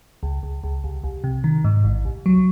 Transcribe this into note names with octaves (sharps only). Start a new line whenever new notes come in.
C#2
C#2
C#2
C2
C2
C3
D#3
G#2
A1
C2
F#3